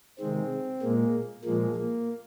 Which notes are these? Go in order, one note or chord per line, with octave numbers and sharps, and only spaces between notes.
C3 D#3 G#3 C4
A#2 G#3 A#3
A#2 F3 G#3 A#3
A#3